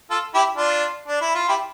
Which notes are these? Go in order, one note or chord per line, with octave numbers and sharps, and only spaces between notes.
F4 A4
E4 G4
D4 F4
D4
E4
F4
E4 G4